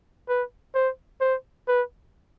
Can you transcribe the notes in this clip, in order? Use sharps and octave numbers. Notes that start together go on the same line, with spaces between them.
B4
C5
C5
B4